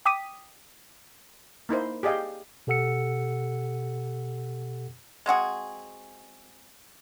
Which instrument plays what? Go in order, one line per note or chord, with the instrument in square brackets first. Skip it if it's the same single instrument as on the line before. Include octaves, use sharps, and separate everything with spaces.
[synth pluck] G5 D6 D#6 B6 D#7
[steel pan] A#3 D#4 E4 C5
G4 G#4 D5 D#5 F5 G5
[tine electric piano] B2 G4 A4 F#5 E6 C#7
[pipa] G#3 C4 F#4 G#4